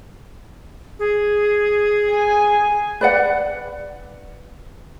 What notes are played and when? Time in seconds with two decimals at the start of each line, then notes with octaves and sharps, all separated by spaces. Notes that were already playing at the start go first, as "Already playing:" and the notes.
0.99 G#4
2.11 G#5
3.01 B4 D5 F#5